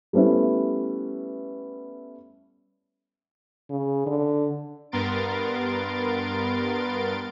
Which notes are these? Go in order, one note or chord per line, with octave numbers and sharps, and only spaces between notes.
G3 A3 B3 C#4 E4
C#3
D3
G2 B3 A#4 C6 A6 D7